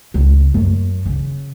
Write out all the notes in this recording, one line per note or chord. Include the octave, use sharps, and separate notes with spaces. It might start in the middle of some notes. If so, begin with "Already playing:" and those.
C#2
F#2
C#3